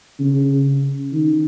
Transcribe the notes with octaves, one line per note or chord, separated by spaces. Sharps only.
C#3
D#3